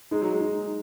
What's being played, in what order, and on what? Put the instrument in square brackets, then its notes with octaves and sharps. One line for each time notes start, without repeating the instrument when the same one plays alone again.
[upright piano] G#3 [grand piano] D#4
[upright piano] F#3
G#3
[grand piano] D#4